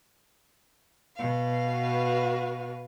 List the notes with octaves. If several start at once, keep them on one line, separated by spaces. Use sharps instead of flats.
B2 F5
F#4 B4